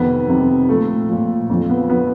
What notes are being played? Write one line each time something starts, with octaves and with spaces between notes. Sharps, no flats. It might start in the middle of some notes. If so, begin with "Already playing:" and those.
Already playing: F2 C3 D#3 B3
F2 C3 D#3
A#2 F3 A3
A#2 F3
F2 D3 F3
B3
D3 F3 B3